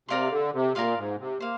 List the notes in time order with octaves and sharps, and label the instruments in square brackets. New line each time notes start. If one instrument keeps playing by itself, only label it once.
[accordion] C3 [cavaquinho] A#4 D5 F5 C6
[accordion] D3
C3
[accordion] A#2 [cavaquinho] A#4 D5 F5 C6
[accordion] G#2
C3
[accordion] A#3 [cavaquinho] C5 F5